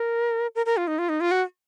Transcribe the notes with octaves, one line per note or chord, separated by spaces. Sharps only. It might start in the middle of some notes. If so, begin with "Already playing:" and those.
Already playing: A#4
A#4
A#4
F4
D#4
F4
D#4
F4
F#4